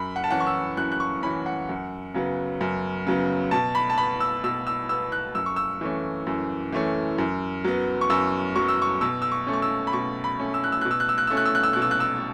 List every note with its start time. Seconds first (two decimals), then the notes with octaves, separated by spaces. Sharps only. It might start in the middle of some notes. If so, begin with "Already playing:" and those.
Already playing: F#2 B5
0.16 F#5
0.24 A5
0.31 E3 C#4 F#5
0.40 C#6
0.47 E6
0.77 F#2 F#6
0.92 F#6
1.00 C#6
1.23 E3 C#4 B5
1.46 F#5
1.69 F#2
2.14 C#3 F#3 B3
2.61 F#2
3.07 C#3 F#3 B3
3.51 B2 A5
3.75 B5
3.90 A5
3.98 B3 B5
4.20 E6
4.44 B2 E6
4.67 E6
4.89 B3 E6
5.12 F#6
5.35 F#2 E6
5.46 C#6
5.56 E6
5.81 E3 A3 C#4
6.27 F#2
6.72 E3 A3 C#4
7.18 F#2
7.64 F#3 B3
8.01 C#6
8.10 F#2 E6
8.56 F#3 B3 C#6
8.68 E6
8.82 C#6
9.01 B2 E6
9.22 E6
9.32 C#6
9.47 A3 C#4
9.53 C#6
9.62 E6
9.87 B5
9.93 B2 C#6
10.24 B5
10.39 A3 C#4
10.54 E6
10.64 F#6
10.72 E6
10.81 B2 F#6
10.91 E6
11.00 F#6
11.09 E6
11.18 F#6
11.27 A3 C#4 E6
11.37 F#6
11.46 E6
11.55 F#6
11.63 E6
11.73 B2 F#6
11.82 E6
11.91 F#6
12.00 E6